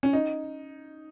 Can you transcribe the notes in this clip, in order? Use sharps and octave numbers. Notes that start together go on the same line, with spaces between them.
C#4
D#4